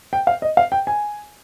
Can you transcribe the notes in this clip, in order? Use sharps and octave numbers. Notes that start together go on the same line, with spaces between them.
G5
F5
D#5
F5
G5
G#5